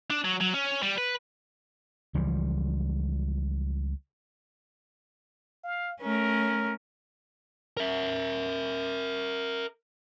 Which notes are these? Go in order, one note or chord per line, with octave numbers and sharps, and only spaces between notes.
D4
F#3
F#3
C#4
G3
B4
C#2 E3 F3 G3
F5
A3 C#4 A#4
A#4 E5